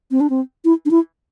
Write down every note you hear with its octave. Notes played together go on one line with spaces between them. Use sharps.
C4
D4
C4
E4
D4
E4